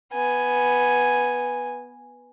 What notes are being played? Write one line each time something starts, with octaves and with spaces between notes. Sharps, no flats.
B3 G#5